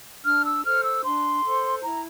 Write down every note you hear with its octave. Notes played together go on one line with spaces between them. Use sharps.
D4 F6
E6
A4 C5 F6
E6
D4 C6
A4 C5
E4 A#5